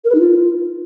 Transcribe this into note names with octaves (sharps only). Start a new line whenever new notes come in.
A#4
B4
D#4
F4